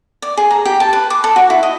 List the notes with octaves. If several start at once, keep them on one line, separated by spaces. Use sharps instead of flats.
D5
G#4
A#5
G4
A5
B4
D6
A4
F#4
E4
D#5